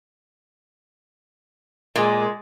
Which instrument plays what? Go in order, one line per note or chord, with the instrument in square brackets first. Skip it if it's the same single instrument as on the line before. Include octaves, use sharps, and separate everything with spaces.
[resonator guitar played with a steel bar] A#2 [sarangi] G#3